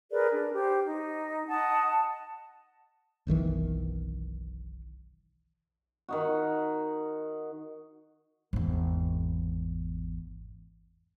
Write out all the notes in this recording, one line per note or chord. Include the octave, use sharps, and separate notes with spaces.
G#4 A#4 B4 D5
D4
G4 C5
D#4
D#5 F#5 A5 D#6
A5
F#1 B1 D#3 E3
D#3 D#4 F#4
G#1 E2